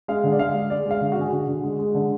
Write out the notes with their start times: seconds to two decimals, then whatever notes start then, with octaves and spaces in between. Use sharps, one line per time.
0.08 G#3 F5
0.24 D3
0.32 D5
0.39 G#3 F5
0.54 G#3
0.70 G#3 D5
0.86 G#3 F5
1.01 D3
1.12 F#4
1.17 D3 G#4
1.31 D3 F#4
1.48 D3
1.63 G#3
1.79 G#3
1.95 D3